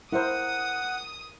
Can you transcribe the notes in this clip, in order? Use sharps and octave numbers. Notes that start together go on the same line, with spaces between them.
E4 A#4 C5 F#5 D#6